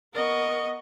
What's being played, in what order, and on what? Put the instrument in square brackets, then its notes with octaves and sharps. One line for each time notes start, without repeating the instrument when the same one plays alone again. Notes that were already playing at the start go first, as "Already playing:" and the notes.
[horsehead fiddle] B3 D#5 [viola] A#4 C#6